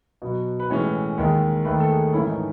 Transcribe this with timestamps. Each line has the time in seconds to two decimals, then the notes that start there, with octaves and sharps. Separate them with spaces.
0.22 B2 F#3 B3
0.60 B4
0.70 A2 E3 G#3 C#4 C#5
1.18 D#2 D#3 G#3
1.65 D#2 D#3 A3 B4
1.80 A4
1.89 G#4
2.13 G#2 E3 A3 C#4 E4
2.29 D#4